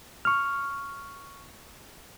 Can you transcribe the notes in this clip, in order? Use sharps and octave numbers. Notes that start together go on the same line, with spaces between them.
C#6 F6